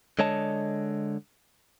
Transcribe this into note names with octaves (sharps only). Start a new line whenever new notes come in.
D3 G#3 C#5 D#5 A5